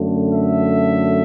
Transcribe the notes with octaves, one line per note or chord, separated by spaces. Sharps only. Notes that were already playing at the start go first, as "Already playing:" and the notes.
Already playing: F#2 D3 A3
E5